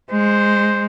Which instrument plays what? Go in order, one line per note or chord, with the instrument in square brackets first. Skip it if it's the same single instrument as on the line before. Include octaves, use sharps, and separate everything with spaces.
[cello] G#3 [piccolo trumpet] C5